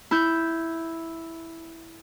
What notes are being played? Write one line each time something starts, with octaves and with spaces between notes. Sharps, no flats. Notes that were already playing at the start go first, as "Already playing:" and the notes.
E4 G6